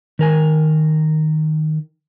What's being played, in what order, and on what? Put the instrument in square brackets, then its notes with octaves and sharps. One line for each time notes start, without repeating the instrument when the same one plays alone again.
[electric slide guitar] D#3 A#4 G#5